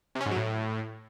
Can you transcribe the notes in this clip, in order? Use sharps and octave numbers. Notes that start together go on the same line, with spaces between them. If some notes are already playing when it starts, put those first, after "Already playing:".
C3
C#4
G#2
F#3
A2